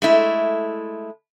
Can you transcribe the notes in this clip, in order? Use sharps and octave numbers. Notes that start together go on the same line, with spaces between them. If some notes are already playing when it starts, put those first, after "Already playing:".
G#3 A3 E4